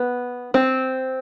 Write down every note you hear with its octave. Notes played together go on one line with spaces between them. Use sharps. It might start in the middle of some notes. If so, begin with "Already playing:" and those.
Already playing: B3
C4